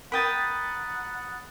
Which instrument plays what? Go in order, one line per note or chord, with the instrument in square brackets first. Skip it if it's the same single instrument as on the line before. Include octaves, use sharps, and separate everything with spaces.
[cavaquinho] A#4 G5 [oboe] F#5 [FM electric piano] B5 D#6 A6